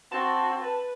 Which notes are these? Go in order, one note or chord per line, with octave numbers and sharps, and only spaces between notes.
C4 F#4 A5
B4